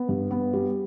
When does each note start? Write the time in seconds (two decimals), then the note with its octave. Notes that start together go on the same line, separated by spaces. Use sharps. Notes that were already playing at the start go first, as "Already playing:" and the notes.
Already playing: B3
0.09 G2
0.31 B3
0.53 G3